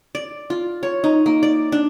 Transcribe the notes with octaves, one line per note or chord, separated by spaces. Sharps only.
D5
F4
C#5
D#4
A#3
D5
D4